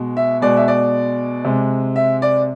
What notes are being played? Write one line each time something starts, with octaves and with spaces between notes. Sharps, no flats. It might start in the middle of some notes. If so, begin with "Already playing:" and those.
Already playing: B2 G#3
E5
B2 G#3 D5
E5
D5
C3 G#3
E5
D5